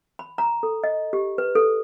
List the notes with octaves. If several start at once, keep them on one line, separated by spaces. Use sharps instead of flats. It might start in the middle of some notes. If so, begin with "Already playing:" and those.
B5
A#5
A4
D#5
G4
B4
A4